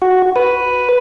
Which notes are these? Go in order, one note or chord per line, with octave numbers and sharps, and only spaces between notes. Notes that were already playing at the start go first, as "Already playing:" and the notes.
F#4
B4